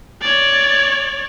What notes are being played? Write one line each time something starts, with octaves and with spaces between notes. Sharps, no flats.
C#5 D5